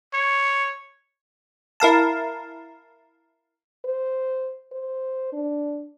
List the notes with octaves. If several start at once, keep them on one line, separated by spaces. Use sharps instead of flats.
C#5
E4 A#4 F5 A5
C5
C5
D4